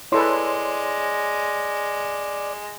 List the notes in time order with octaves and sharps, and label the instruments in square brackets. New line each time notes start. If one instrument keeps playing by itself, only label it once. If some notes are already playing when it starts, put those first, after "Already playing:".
[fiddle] G#3 [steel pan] E4 A4 B4 [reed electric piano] C#5 C6 [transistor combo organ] D5